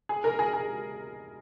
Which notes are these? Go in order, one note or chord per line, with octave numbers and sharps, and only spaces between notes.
G#4
A#4
G#4
G#4